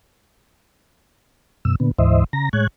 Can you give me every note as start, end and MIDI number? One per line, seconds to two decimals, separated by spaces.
1.65 1.75 42
1.65 1.75 47
1.65 1.75 88
1.80 1.91 46
1.80 1.91 50
1.80 1.91 59
1.98 2.24 38
1.98 2.24 44
1.98 2.24 52
1.98 2.24 72
1.98 2.24 75
1.98 2.24 76
2.33 2.49 49
2.33 2.49 82
2.33 2.49 94
2.53 2.67 45
2.53 2.67 56
2.53 2.67 73
2.53 2.67 90
2.53 2.67 92